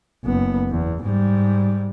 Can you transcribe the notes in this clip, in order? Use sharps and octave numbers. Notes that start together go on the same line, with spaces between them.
F#1 B3
E2
G#2 G3